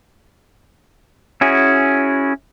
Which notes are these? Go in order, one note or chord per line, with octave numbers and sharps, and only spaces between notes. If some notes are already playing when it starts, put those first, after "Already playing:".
C#4 E4 F#4 G#4